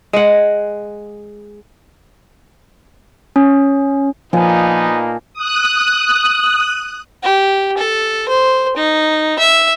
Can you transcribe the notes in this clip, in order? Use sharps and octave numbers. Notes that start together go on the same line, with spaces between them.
G#3 F#5
C#4
A#2 F3 A#3 B3 D#4 G#5 A5
D#6 F#6
G4
A4
C5
D#4
E5